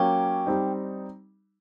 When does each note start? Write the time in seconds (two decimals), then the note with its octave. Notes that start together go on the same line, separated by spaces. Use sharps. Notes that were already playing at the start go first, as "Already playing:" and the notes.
Already playing: F#3 A#3 C#4 G4
0.46 G3 C4 D#4